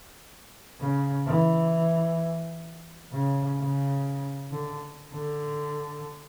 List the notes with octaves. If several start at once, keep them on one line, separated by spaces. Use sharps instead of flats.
C#3
E3
C#3
C#3
D3
D3